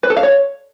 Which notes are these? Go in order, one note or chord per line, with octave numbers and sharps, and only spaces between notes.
B4
A4
F5
C#5